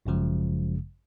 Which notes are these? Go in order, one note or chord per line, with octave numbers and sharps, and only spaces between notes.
G#1 F#2 C#3 F3 G#3